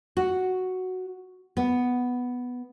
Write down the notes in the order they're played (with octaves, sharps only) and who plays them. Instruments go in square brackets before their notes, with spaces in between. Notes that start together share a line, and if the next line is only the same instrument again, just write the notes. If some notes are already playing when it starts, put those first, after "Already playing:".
[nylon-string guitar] F#4
B3